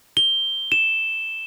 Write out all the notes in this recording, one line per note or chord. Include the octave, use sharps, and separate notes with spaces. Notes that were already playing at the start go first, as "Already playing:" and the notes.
G7
E7